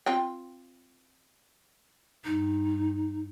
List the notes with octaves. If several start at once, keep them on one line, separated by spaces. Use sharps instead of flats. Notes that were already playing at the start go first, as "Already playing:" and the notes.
C4 F4 G5
G2 D#4